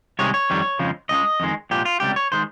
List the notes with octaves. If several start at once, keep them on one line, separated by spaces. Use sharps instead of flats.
C2 C3 D#3 G#3 C#5
C#5
F2 D#3 G3
F2 C#3 F3 G#3
C#2 C#3 G#3 D#5
F2 D#3 G#3
C2 A#2 F3 G#3 G4
F4
C#2 C3 G3 G4
C#5
D#3 G#3 C5